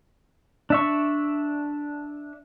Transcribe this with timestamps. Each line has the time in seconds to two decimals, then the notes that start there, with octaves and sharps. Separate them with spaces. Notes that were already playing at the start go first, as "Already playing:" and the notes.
0.70 D4 E5 C#6